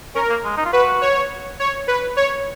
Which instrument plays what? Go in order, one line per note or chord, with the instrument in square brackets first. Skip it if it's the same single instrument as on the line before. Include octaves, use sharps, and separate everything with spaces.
[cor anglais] C#4 [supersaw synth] A#4
[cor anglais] A#3
G#3
D#4
F4
[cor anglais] F#4 [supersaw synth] B4
[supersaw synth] C#5
C#5
B4
C#5